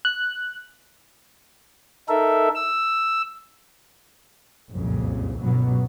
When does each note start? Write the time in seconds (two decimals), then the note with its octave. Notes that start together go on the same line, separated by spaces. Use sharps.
0.05 F#6
2.09 D#4 A4 A#4 E5
2.55 E6
4.71 F#1 C2 F2 A#2 C#3
5.39 G1 C#2 B2 F#3 B3